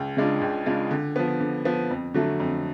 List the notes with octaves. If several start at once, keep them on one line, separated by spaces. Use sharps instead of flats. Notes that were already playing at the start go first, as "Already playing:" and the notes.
Already playing: C#2
C#3 G#3 D4 F4
C#2
C#3 G#3 D4 F4
D3
F3 B3
D3
F3 B3
F2
D3 F#3 A3
F2